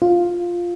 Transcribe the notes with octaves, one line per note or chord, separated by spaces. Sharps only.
F4